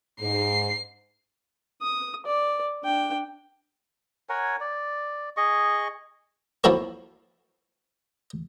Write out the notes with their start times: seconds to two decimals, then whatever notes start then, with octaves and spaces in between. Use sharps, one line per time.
0.21 G#2 C7
1.82 D#6
2.26 D5
2.84 D4 G5
4.29 A#4 C#5 F#5 G#5
4.60 D5
5.37 G#4 D#5 C#6
6.64 F3 A#3 E4 F#4 A#4 C#5